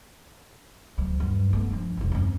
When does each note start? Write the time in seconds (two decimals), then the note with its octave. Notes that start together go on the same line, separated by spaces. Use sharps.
0.98 D2 F#3
1.20 G2
1.53 A3 B3
1.71 F3 D4
1.97 E1 A1
2.12 F#2 C4